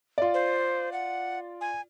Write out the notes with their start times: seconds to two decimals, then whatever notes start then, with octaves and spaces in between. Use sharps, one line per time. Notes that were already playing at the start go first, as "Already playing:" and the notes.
0.18 F4 D5
0.34 C5
0.92 F#5
1.61 G#5